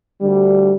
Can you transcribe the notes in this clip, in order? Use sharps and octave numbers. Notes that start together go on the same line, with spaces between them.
D2 D3 G3